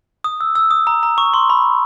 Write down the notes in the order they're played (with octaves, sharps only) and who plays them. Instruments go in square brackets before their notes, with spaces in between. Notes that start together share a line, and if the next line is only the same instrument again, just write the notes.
[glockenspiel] D#6
E6
E6
D#6
A#5
A#5
C#6
C6
B5